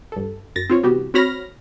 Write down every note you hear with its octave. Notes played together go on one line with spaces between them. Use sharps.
G2 A4
F#2 A6 A#6
C4 F4 C#5
C3 E3 G3 B3 F#4 G4
C4 F#4 C#5 B5 F6 A#6